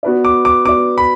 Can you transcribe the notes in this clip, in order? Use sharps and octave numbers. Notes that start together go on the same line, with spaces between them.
B3 F#4 B4 D5
D6
D6
B3 F#4 B4 D5 D6
B5